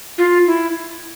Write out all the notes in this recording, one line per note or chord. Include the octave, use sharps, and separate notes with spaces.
F4
E4